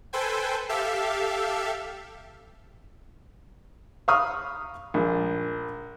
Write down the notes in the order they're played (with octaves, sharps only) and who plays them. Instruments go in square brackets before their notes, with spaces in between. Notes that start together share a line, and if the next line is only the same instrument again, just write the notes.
[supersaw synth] A4 B4 C5 G5 G#5
G4 A4 E5 F5
[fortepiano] F5 A#5 B5 C#6 D#6 F6
A#1 G#3